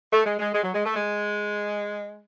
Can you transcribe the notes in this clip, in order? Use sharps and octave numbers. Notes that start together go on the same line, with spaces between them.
A3
G#3
G#3
G#3
F#3
G#3
A3
G#3